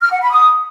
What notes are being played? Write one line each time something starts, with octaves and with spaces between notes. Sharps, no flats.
F6
F#5
B5
D#6